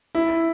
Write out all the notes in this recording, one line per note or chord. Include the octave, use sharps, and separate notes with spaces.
E4